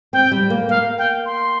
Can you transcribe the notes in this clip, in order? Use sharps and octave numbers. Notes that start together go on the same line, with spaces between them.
C4 G5
G3
A#3
A#3 F5
G5
C6